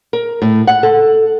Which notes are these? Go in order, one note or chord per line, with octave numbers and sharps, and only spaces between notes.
A#4
A2
F#5
A4